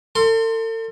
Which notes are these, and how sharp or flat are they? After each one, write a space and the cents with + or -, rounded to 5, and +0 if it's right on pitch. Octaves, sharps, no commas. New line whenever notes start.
A4 +40 C6 +0